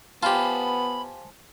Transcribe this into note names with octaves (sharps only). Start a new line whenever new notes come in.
B3 F4 G4 C5 G#5 A5 B5